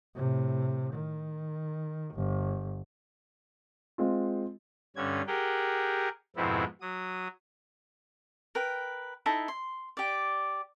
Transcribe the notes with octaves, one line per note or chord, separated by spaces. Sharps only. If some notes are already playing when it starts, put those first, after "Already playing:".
A2 C3
D#3
G1
G#3 C4 F4
G2 D3 C#4 G#6
G4 G#4 A#4 F#5 G5
F2 G#2 B2 B3 C4 E4
F#3 D#6
A#4 B4 G5
D#4 E4 A4 A5
C6
G4 D5